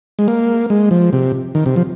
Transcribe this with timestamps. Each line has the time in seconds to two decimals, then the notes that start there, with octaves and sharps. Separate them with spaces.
0.19 G#3
0.28 A#3
0.70 G#3
0.91 F3
1.13 C3
1.55 D#3
1.66 C3
1.76 F3